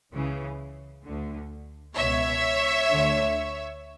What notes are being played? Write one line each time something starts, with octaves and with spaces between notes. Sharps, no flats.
C#2 C#3 E3
D2 D3
C#2 B2 C#5 E5
D2 D3